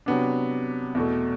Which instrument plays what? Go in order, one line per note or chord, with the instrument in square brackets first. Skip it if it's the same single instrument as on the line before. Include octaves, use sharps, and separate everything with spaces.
[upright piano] C3 F#3 B3 D4
E2 B2 A3